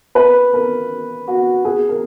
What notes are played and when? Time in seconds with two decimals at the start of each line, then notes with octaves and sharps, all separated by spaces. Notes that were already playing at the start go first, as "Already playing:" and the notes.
0.15 B4
0.53 A#4
1.28 F#4
1.65 G#4
1.89 A#4